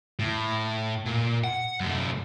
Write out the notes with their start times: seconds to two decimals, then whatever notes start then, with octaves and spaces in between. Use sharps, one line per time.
0.19 A2
1.05 A#2
1.44 F#5
1.80 F#2 A3